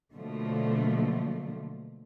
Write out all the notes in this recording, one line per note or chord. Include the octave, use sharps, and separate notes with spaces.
B2 D3 F3 F#3 A3 A#3